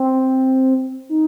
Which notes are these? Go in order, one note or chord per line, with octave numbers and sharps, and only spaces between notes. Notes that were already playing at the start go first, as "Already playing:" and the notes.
Already playing: C4
D#4